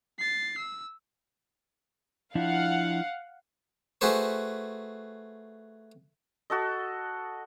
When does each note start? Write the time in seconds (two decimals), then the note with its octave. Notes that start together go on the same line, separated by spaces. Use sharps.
0.19 A6 C7
0.57 E6
2.35 F3 D4 E4 F5 F#5
4.01 A3 F#4 G#4 B4 C5 C#6
6.50 F#4 A4 D#5